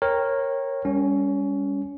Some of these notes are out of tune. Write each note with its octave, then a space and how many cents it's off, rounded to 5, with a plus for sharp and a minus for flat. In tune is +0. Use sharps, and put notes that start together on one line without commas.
A#4 +0 C#5 -20 G5 +5
G3 +35 C#4 +20